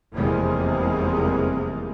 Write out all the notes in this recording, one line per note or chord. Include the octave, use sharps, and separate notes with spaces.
F1 E2 C3 G3 G#3 A#3